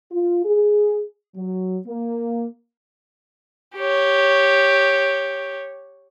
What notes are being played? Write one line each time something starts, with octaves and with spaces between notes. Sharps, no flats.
F4
G#4
F#3
A#3
G4 C#5